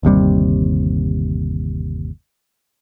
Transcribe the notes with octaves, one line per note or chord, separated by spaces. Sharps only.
G1 D#2 C3 G3